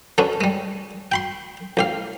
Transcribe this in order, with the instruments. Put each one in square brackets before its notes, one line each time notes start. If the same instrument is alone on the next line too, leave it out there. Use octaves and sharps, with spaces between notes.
[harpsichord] D3 C#4 D4 B4
G3 G#3
G5 B5 C6
A1 G4 F5